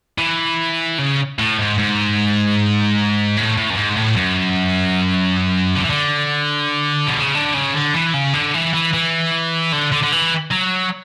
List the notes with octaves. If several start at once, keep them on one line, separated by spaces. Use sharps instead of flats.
E3
C#3
A2
G#2
G#2
A2
A2
F#2
G#2
A2
F#2
D3
E3
D3
B2
C#3
D3
C#3
D3
E3
C#3
D3
E3
E3
E3
D3
D3
D3
E3
F#3